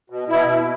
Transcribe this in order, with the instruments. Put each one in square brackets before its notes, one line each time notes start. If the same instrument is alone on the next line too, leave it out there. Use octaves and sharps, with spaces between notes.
[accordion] B2
B2 E4
B2